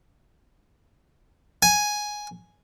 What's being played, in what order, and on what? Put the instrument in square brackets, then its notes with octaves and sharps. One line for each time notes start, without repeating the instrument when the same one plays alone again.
[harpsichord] G#5